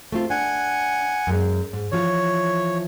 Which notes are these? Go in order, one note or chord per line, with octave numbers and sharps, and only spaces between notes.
A3 C4 F4
D4 F#5 G#5
F#2 G#3
G#2
E3 F3 F4 C#5